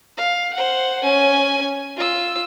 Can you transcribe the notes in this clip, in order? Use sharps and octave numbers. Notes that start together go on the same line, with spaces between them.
F5
C5 F#5
C#4 G#5
F4 E6